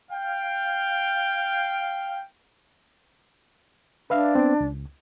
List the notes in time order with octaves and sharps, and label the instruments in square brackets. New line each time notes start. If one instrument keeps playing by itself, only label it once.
[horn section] F5 G5
[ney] D4 [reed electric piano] B4 E5 F5
[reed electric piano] B3 C4
C#2